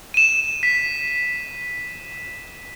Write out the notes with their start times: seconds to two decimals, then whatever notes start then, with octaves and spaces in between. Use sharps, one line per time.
0.14 D#7 E7
0.63 B6